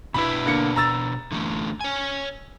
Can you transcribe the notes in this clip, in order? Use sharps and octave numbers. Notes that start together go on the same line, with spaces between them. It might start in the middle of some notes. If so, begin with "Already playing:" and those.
B2 D4 E4 B4 B5
D3 A#3 C#7
A#5 E6 A6
D3 E3 A3
C#5 G#5